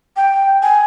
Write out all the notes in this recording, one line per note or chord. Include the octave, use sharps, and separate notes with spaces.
G5
G#5